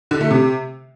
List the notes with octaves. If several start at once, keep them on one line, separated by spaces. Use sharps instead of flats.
D3
A3
C3